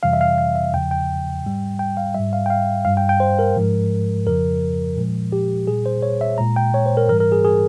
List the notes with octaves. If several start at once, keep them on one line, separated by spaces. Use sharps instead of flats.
F2 C3 E3 G3 F5
E5
F5
F5
E5
E2 C#3 F3 G5
G5
G#2 G3
G5
F5
G#2 G3 E5
F5
G5
F5
G2 G3 F5
G5
G5
C5
A#4
G#2 F3 G#3
F2 C#3 F3 A#4
A#2 F3 G#3
G4
A#2 G3 G#4
C5
C#5
E5
A#2 G#3 A#5
G5
C#5
C5
A#4
G#2 E3 G3 A#4
A#4
G#4
G#4